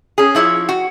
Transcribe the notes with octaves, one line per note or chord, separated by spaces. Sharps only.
C#4 G#4
F3 E4 C#5 E5
F#4